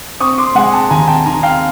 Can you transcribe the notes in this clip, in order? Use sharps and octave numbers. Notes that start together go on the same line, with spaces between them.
C4 C#6 D#6
C6 D6
G#3 F#5 G#5
G5 A5
D#2 G#5 A#5
G5 A5
D#3 G#5 A#5
F5 G5